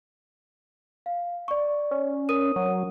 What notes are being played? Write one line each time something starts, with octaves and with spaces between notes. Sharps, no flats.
F5
D5 C#6
C#4
A#4 D#6 D#7
F#3